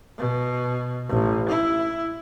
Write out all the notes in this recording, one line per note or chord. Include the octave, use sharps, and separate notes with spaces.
B2
A1
E4